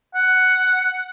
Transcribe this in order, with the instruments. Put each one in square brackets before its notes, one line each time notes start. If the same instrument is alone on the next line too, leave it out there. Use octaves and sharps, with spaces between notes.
[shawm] F#5